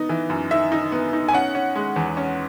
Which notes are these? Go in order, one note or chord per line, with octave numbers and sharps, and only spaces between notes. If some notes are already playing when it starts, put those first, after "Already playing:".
Already playing: B3 D#4
E3
F#2
D#4 E5
D#4
B3
D#4
G#5
C#4 F#5
C#4
G#3
E2
C#4